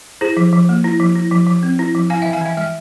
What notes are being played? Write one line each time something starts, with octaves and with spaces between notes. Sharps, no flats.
E4 G#4 C5
F3
F3
A#3
E4
F3
E4
F3
F3
C4
E4
F3
E4 F5 G#5
E3 E5 G5
F5 G#5
E3 E5 G5
G#3 E5 G5